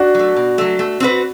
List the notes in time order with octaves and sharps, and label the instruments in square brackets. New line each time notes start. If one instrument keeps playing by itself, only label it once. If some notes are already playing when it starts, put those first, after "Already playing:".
Already playing: [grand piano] D4 F#4
[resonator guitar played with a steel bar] F#3 A3
B2
F#3 A3
A3
C4 F#4 B4